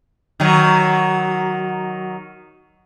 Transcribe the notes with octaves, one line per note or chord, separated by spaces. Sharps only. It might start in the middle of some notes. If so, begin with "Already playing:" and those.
D#3 F#3